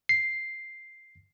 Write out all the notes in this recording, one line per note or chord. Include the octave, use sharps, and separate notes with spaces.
C7